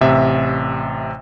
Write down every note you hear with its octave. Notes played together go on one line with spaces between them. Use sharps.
A1 C3 E5